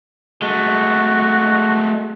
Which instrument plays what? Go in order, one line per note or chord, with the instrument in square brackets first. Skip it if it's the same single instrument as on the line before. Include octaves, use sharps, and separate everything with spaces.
[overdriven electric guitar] G#3 A3 [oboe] F#4